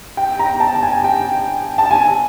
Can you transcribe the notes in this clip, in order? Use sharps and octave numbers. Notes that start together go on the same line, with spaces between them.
G5
A#5
A5
G#5
G5
A5
G#5